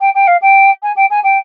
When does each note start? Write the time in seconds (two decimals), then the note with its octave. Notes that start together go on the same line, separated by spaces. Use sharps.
0.01 G5
0.15 G5
0.27 F5
0.42 G5
0.83 G#5
0.96 G5
1.11 G#5
1.24 G5